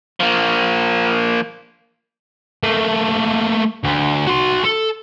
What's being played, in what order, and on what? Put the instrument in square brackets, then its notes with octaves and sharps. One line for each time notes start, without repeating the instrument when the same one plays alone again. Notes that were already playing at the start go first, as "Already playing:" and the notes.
[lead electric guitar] F3 A#3
[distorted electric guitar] A3 A#3
D2
F#4 C6
A4